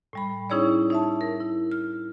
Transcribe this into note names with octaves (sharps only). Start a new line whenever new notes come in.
A2 G3 B5
C#4 D#4 E4 G#4 C#5 D5
D#4 E5 A5
A#4
E4
F6